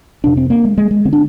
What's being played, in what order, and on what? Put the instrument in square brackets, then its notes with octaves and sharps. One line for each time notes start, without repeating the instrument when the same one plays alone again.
[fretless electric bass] F2 C3 D4
C4
A#3
G#3
G#3
G#3
D3 C4
D4